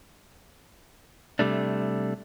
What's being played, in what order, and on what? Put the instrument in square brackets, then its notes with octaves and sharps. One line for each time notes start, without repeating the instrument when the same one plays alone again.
[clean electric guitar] C3 G3 A3 D4